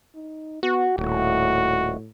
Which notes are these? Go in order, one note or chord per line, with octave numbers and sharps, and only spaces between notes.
D#4
B3 F#4
D#1 A2 F#4